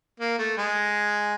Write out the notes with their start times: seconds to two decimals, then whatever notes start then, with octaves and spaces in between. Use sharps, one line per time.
0.20 A#3
0.39 A3
0.57 G#3